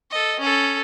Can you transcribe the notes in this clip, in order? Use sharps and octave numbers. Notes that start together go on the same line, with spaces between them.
A4 D#5
C#4 A4